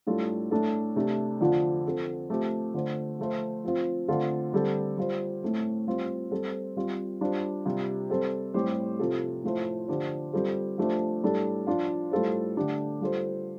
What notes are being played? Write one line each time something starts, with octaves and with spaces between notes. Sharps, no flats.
A2 G3 D4 F4 A4
A2 A3 D4 A4
C3 A3 D4
F2 D3 F3 D4
F3 C4 A4
F3 A3 C4 G4
D3 A3 F4 C5
F3 A3 F4 C5
F3 C4 F4
D3 A3 C4 F4 A4
D3 G3 C4 A4
G3 F4 C5
A2 A3 C4
G3 C4 F4
G3 C4 A4 C5
G3 C4 F4 C5
G3 D4 F4 C5
C3 G3 F4
G3 C4 A4 C5
A2 G3 C4 G4 C5
F2 C3 F3 C4 A4
A2 F3 A3 F4 C5
D3 F3 D4 G4 C5
G3 C4 F4 A4 C5
F3 A3 D4 G4 C5
A2 G3 D4 A4
F3 D4 F4
A2 G3 F4 A4 C5
D3 A3 D4 G4
G3 F4 A4 C5